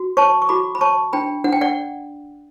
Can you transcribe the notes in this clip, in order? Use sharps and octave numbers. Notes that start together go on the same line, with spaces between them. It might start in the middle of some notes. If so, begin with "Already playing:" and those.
Already playing: F#4
C#5 A5 C#6
C#6
F#4 B5 D6
B5
C#5 A5 C#6
D4 G5 B5
D4 F#5
G5
D5 F#5